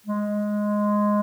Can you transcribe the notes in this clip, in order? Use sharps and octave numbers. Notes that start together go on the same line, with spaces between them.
G#3